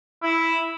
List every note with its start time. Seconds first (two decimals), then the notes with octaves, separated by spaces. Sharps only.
0.22 E4